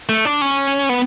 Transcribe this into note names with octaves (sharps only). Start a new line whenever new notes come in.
A3
D4
C#4
B3